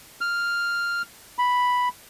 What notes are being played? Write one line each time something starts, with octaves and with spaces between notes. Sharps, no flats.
F6
B5